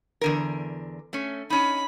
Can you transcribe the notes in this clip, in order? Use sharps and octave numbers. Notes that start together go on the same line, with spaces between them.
E2 D3 A#4
A3 C#4
C#4 D#4 B5